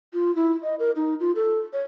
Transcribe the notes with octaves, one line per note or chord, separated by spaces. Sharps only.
F4
E4
D#5
A#4
D#4
F4
A4
C#5